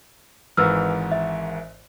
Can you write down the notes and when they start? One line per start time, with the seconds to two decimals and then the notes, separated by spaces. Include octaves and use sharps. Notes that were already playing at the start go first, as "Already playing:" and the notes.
0.57 G#1 G#2 E3 B4 E6 F6
1.12 E5